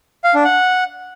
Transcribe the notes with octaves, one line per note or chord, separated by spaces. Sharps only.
F5
D4
F#5